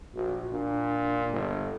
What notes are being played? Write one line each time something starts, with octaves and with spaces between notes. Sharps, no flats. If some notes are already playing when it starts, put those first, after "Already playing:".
A#1 F#4
A#2 D4
G1 A4